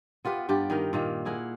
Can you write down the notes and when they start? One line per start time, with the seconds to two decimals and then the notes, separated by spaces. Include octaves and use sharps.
0.25 B3 F4 G4 B4
0.49 G2 F4 G4 D5
0.70 D#3 D#4 A#4
0.93 A#2 D#3 A#3
1.25 E4 G#4 A#4 F#5